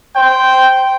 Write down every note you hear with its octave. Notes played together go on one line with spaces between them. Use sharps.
C5 G5